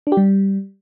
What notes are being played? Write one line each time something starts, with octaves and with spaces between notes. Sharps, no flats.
D4
G4
G3